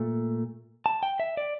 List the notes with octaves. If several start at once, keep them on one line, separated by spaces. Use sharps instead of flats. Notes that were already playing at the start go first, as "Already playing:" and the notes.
Already playing: A#2 A3
A5
G5
E5
D5